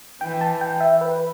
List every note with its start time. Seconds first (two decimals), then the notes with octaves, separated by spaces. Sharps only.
0.21 E3 G5
0.41 A5
0.61 G5
0.80 E5
1.01 B4